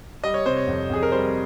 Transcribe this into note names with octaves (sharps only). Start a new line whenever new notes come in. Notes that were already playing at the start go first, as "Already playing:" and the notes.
G3 D#5
C#5
C3 C5
C#5
F2
F2 G#4
A#4
G3 C5